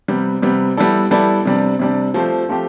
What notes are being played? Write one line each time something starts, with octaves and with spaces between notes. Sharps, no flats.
C3 G3 B3
C3 G3 B3
G3 B3 E4 A4 D5
G3 B3 E4 A4 D5
C3 G3 D4
C3 G3 D4
F3 A3 C4 G4
F3 A3 C4 G4